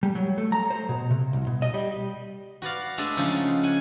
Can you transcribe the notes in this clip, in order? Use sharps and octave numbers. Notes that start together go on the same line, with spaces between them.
G3
F#3
A3
A#5
C5
B2
C3
C2
B2
D#5
G3
F#4 B4 D5 F5
G#3 A3 D4 A4
C#3 F3 D#4
F#5 G#5